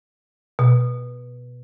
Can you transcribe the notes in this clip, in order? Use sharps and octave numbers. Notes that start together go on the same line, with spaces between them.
B2